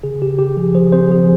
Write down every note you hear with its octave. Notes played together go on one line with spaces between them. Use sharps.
C#3 G#4
C#3 G4
C#3 G4
F3 G#4
F3 G#4 C5
C4 G#4 C5
F3 G#4